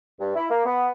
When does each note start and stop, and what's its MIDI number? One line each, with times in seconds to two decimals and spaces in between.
0.20 0.35 43
0.36 0.46 64
0.50 0.63 58
0.66 0.90 59